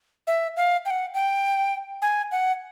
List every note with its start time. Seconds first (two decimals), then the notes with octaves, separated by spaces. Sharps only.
0.27 E5
0.57 F5
0.86 G5
0.90 F#5
1.14 G5
2.02 G#5
2.32 F#5